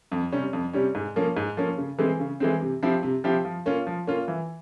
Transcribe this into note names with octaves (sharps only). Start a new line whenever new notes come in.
F2
C3 G3 C#4
F2
C3 G3 C#4
G#2
F3 A#3 C#4
G#2
F3 A#3 C#4
C#3
E3 G#3 C4
C#3
E3 G#3 C4
C3
F3 C4 E4 G4
C3
F3 C4 E4 G4
F3
A#3 C#4 F4
F3
A#3 C#4 F4
E3